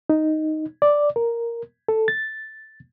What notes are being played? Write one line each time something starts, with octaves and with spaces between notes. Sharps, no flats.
D#4
D5
A#4
A4
A6